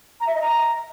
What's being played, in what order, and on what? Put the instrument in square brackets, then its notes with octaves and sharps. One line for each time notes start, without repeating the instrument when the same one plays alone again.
[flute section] A#5
E5
D#5
A#5